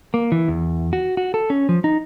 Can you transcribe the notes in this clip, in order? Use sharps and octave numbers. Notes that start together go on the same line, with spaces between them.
A#3
E3
E2
F#4
F#4
A4
C#4
F3
D#4